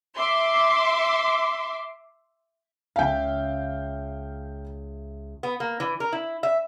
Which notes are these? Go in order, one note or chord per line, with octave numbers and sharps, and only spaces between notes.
E5 C6 D6
C#2 E5 F5 G5
B3
A#3
E3
A#4
E4
E5